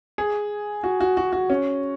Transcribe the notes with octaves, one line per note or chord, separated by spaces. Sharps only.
G#4
F#4
F#4
F#4
F#4
C#4